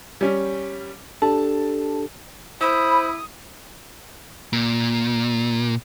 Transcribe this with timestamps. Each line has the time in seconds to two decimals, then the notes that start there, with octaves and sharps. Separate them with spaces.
0.21 G3 C#4
1.22 D4 G4 A4 A5
2.61 E4 C5 B5 D#6
4.53 A#2